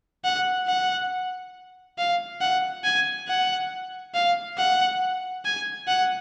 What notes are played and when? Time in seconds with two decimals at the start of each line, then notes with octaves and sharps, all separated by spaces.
0.24 F#5
0.68 F#5
1.98 F5
2.41 F#5
2.84 G#5
3.28 F#5
4.14 F5
4.57 F#5
5.45 G#5
5.87 F#5